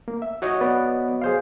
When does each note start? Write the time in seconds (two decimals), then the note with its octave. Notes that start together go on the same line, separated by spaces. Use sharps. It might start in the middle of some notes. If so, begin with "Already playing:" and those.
0.08 A#3
0.22 E5
0.42 F#4 C#5 D#5
0.61 B3 B4 D5
1.22 G#4 C5 F5